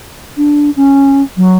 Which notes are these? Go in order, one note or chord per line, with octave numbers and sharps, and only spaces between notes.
D4
C#4
F#3